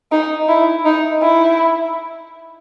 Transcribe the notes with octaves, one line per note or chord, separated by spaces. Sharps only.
D#4
E4
D#4
E4